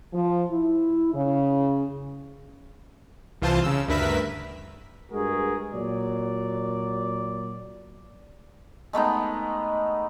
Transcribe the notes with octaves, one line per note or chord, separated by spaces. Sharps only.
F3
E4
C#3
C2 E3 F4 C5 A5
C#3 E6
D2 G2 A#4 B4 E5 B6
G2 G#3 F#4 G#4 A#4
A#2 F#3 D5
G#3 A3 B3 D#4